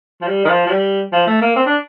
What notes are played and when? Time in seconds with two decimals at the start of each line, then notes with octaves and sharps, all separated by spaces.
0.21 F3
0.28 G3
0.45 D#3
0.49 F3
0.66 F3
0.71 G3
1.12 F3
1.27 A3
1.41 A#3
1.56 C4
1.66 D4